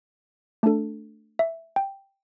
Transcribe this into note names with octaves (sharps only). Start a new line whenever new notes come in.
A3 D4 A4 A5
E5
G5